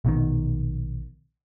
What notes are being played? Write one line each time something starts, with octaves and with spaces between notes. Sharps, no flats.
A#1 B2 D#3